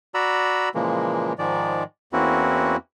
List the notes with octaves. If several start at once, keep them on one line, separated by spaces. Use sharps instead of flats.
F#4 D5 A#5 B5 E6
A#2 C#3 E3 F3 G#3 A#3
G#2 D#3 F3 G#3 D5
E2 A#3 C4 C#4 E4 F#4